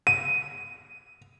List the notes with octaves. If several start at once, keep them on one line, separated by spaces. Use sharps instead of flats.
D#7